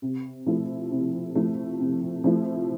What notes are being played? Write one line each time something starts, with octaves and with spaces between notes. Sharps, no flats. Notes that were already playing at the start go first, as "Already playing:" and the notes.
C3
F3 A3 E4
C3
F3 A3 E4
C3
F3 A3 E4